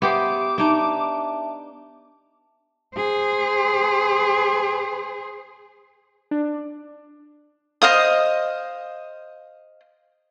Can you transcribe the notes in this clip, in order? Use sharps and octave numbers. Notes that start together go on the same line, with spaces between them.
B3 G4 C5 E5 C6 D6 D#6
D4 D#4 E5 A5
G#4 C5
D4
C5 D#5 F5 D#6